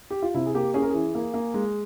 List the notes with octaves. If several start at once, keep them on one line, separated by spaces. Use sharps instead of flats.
G4
F4
C3 E4
G#4
A#3 G4
C#4 G#4
A#4
E3 G#4
A#3
A#3
G#3